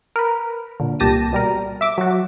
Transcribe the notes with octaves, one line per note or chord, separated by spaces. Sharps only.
A#4 B4
A#2 D3
C2 A#2 G4 A5 A#6 D#7
B2 G3 A#4
E5 D6
F#3 F#4